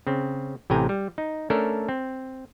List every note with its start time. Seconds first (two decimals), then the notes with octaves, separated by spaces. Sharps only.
0.07 C#3 C4
0.70 A1 A2 C3 G5 G#5 A#5
0.89 G3
1.18 D#4
1.50 A3 C#4 D4 A4 A#4
1.89 C4